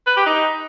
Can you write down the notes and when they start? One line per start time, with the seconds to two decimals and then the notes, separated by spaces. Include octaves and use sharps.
0.07 B4
0.16 G4
0.26 D#4